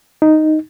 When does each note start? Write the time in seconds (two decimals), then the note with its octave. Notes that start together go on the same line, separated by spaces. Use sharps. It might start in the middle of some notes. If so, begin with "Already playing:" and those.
0.22 D#4